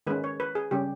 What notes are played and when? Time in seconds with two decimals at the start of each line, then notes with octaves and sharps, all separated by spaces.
0.07 D#3 G#3 C#4 B4
0.24 C#5
0.40 B4
0.55 G#4
0.71 C#3 G3 C#4 G4